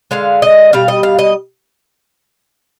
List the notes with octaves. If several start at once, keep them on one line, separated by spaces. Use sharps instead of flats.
D3 G#3 F5
D#5
B2 G3 F5
D#5
F5
D#5